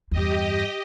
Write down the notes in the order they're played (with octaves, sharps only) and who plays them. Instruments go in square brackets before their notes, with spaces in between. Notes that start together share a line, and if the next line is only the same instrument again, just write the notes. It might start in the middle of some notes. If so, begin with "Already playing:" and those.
[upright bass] E2 G2 [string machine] G4 D#5